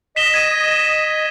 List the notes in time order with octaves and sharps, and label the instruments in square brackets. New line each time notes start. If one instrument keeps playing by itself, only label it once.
[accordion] D#5 [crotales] B6 E7 G7
[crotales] G#6 D#7